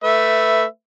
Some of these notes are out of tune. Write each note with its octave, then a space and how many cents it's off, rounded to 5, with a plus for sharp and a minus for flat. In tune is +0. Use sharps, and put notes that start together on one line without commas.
A3 +10 B4 +0 E5 +0